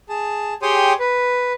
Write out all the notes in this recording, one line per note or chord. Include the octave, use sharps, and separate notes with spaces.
G#4 A5
G4 G#4 C#5 G5 C6 D#6
B4